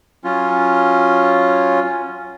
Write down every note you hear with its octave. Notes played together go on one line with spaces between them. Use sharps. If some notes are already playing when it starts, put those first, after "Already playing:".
F#3 C#4 F4